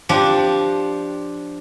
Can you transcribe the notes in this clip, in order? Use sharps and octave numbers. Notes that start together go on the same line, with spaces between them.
F3 D4 G4